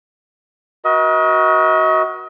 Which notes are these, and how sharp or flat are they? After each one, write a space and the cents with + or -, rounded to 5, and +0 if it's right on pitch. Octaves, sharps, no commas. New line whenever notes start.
F#4 +0 A#4 +45 D#5 +35